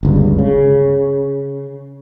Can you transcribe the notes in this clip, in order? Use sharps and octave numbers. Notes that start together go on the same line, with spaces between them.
G1 C#2 G2
C#3